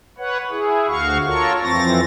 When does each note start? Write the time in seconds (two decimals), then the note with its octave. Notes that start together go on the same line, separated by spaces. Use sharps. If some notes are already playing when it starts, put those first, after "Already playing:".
0.18 B4 C#5 F#5
0.50 E4 G#4
0.87 D2 F#4 F5 C#6
1.26 F4 A4 A#4 C#5 C#6
1.63 F2 E3 C4 A6 A#6